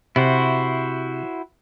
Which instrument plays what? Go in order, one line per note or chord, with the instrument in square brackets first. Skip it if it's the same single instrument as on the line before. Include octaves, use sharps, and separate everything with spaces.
[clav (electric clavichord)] C3 [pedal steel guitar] E4 F#4 C5